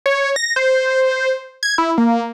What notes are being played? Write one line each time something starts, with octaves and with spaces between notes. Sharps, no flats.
C#5
A#6
C5
G#6
E4
A#3